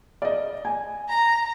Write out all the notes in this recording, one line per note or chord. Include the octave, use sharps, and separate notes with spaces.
D5 D#5
G#5
A#5